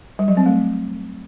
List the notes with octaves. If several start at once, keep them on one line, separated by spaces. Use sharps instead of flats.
G3
F#3
C4
A3